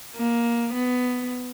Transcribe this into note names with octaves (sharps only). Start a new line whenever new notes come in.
A#3
B3